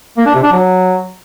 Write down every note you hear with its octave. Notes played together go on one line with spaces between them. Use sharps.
A#3
D4
C3
D4
F#3